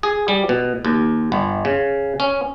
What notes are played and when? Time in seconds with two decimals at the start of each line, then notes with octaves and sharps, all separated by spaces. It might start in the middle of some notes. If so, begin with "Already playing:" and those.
0.03 G#4
0.28 G3
0.49 B2
0.85 D#2
1.32 G1
1.65 C#3
2.20 C#4